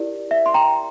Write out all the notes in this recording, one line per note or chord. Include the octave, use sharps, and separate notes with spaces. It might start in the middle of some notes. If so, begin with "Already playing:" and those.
Already playing: E4 G4 A#4 D5
E5
C6
G5 A#5